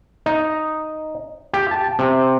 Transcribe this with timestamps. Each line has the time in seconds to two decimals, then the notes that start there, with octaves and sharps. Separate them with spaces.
0.26 D#4
1.53 G4
1.71 A5
1.99 C3